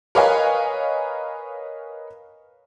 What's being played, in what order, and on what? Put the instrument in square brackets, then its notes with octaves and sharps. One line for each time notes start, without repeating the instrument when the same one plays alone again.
[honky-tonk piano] A#4 B4 C#5 D#5 F5 G#5